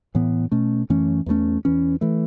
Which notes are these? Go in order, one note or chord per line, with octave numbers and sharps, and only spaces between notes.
A2 E3 B3
B2 A3 C#4
F#2 E3 A3 C#4
E2 E3 A3 C#4
E2 E3 C#4
E3 A3